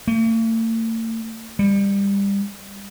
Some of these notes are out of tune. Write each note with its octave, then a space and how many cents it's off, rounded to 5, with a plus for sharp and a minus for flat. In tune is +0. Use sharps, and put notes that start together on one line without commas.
A3 +45
G3 +25